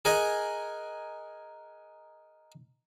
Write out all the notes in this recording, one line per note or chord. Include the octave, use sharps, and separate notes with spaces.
G#4 A#4 D#5 F#5 G#5